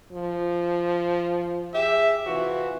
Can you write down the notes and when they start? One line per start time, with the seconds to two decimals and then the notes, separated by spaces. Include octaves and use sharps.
0.13 F3
1.74 G4 G#4 E5
2.26 C3 E3 F4 F#4